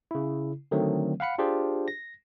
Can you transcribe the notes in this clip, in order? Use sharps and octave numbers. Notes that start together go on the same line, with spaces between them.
C#3 E4
D3 D#3 F#3 A3 C4
F5 F#5 B5 C#7
D4 F4 G4 G#4 C5
A#6